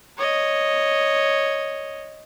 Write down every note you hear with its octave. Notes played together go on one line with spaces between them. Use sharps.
C#5 D#5